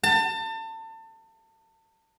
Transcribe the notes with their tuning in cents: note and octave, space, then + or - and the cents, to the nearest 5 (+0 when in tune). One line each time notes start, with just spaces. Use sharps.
A5 +30